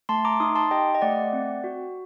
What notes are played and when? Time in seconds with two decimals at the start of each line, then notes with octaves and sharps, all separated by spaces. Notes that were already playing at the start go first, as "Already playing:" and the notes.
0.09 A3 A5 C6
0.25 A#5 D6
0.40 D#4 C6 D#6
0.55 A5 C6
0.71 G4 D#5 G5
0.95 D#5
1.01 A3 D5 F#5
1.33 C4
1.64 F#4